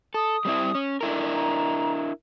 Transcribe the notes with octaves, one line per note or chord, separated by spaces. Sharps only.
A4 D#6
G3 C4 E4
C#4
D4 E4 A4 A#4
A#5